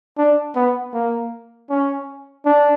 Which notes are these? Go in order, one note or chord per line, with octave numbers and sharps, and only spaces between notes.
D4
B3
A#3
C#4
D4